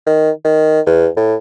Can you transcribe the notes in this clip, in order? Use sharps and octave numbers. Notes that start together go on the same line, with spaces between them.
D#3
D#3
E2
A2